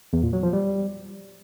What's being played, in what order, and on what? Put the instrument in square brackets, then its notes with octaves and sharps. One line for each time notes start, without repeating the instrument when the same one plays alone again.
[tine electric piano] E2
A#2
F#3
F3
G3